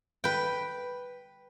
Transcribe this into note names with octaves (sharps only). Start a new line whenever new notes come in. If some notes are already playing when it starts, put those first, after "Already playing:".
B4 G5